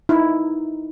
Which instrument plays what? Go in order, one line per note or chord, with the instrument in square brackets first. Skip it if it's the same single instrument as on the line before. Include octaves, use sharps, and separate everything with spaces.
[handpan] D#4 [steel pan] E4